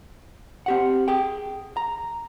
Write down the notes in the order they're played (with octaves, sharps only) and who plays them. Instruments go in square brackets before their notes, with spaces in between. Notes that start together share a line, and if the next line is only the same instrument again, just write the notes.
[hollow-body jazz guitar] C4 G4 F#5
G#4 G5
A#5